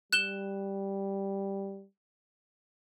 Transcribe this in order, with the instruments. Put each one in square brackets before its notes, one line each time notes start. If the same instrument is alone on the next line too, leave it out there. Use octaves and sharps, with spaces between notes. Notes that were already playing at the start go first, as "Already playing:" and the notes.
[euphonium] G3 [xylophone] F#6 E7 G7